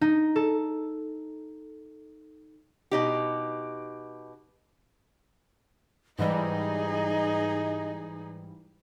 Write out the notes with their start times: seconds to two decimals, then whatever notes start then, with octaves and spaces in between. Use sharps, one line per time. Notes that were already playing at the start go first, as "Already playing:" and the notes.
0.01 D#4
0.36 A4
2.91 B2 D#4 G4
6.19 G#2 E3 G3 D#4 G#4 D#5